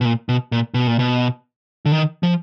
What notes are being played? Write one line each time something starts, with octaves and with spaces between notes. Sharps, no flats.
B2
A#2
B2
A#2
B2
A#2
B2
D3
D#3
F3